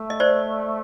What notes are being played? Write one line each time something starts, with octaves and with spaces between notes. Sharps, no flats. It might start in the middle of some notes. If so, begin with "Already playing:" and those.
Already playing: A3
D#5
C5 D5